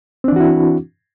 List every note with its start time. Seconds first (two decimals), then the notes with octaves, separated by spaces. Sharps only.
0.24 C4
0.28 D4
0.32 E3
0.36 F#4
0.40 E4